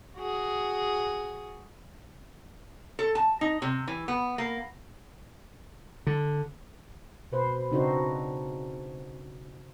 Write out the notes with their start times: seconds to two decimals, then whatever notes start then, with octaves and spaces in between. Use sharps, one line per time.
0.17 F#4 G#4
2.99 A4
3.15 A5
3.41 D#4
3.62 C3
3.88 E3
4.08 B3
4.38 A#3
6.07 D3
7.32 B2 B4 C5
7.71 C#3 C4 D4 D#4 F#4 C5